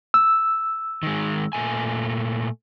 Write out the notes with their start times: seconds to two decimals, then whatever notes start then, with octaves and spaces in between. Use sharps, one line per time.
0.14 E6
1.03 D#3 G#3
1.53 A#2 A3 G#5